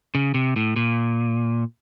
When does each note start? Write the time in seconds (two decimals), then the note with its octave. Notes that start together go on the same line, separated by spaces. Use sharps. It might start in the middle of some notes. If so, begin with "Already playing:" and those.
0.15 C#3
0.34 C3
0.56 A2
0.76 A#2